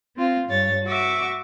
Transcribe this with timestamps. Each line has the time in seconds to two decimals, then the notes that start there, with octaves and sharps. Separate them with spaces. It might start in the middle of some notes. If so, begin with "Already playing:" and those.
0.16 C4 F4
0.48 G2 C#5 A6
0.85 F#4 E5 C#6 D6